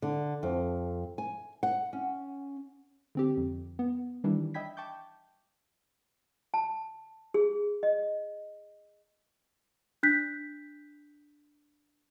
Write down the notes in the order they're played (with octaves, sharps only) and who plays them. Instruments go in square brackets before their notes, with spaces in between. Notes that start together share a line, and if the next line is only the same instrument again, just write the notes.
[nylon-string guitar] D3
F2
G#5
F#5
C#4
[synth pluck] D3 C4 G4
F2
B3
D#3 E3 G3 D4 E4
D#5 E5 G5 B5 G#6 B6
G5 A5 C#6 D6 G6
[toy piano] A5
G#4
D#5
[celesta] D4 F#6 G6 B6